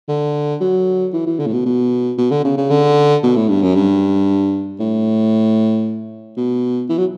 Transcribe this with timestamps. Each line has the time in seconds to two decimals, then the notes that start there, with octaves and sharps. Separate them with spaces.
0.08 D3
0.61 F#3
1.13 E3
1.26 E3
1.39 D3
1.47 A2
1.53 B2
1.66 B2
2.18 B2
2.31 D3
2.44 C#3
2.57 C#3
2.70 D3
3.23 B2
3.36 A2
3.49 G2
3.62 F#2
3.75 G2
4.80 A2
6.37 B2
6.89 E3
6.98 F#3